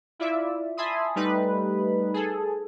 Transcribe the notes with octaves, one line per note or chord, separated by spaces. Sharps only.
E4 F4 D5 E5
E5 G#5 A5 B5 C6 D#6
G3 A3 D#4 B4
G#4 A4